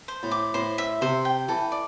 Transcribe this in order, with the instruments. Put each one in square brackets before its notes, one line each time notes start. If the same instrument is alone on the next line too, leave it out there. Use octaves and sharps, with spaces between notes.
[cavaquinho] C5
[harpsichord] A2
[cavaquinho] D6
[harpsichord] A2 [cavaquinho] C5
[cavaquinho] E5
[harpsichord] C3 [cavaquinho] C5
[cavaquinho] G5
[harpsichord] E3 [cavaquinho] A4
[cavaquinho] D5